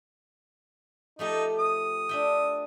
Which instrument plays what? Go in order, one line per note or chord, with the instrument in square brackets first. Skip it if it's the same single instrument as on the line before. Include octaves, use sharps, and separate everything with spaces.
[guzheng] F3 A3 G4 [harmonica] D#4
[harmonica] D#6
[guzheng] D4 E5 G5